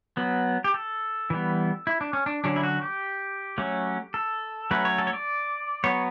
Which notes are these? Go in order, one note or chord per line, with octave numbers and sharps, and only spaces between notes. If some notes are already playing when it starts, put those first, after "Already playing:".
F#3 B3
G4
A4
E3 G3 B3
E4
D4
C#4
D4
D3 F#3 C#4 D4
E4
F#4
G4
F#3 A3 C#4
A4
F#3 A3 C#4 B4
C#5
A4
C#5
D5
F#3 B3 C#5